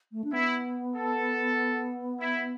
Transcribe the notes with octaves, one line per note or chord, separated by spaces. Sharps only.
A3
D4
B3 E4
A4
E4